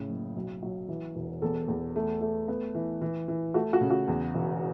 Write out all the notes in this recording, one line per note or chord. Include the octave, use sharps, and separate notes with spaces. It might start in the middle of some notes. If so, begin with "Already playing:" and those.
Already playing: A2 C#3
F#1
B1
F#3
E3
E1
E2 A4
E2
A3
A3
B3
E3
E3
E3
A3 F#4
F#4
C#3
F#4
E2
E1